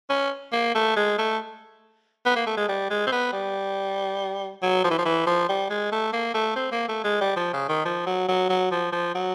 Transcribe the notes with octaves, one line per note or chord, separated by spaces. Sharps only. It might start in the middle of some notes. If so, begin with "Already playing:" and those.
C#4
A#3
A3
G#3
A3
B3
A#3
A3
G#3
G3
G#3
C4
B3
G3
F#3
F3
E3
F3
E3
F3
G3
G#3
A3
A#3
A3
C4
A#3
A3
G#3
G3
F3
C#3
D#3
F3
F#3
F#3
F#3
F3
F3
F#3